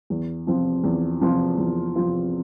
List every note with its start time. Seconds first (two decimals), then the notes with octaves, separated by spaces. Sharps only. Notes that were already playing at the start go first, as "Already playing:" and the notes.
0.10 E2
0.46 C3 F3 C4 F4
0.84 E2
1.20 C3 F3 C4 F4
1.58 E2
1.95 C3 F3 C4 F4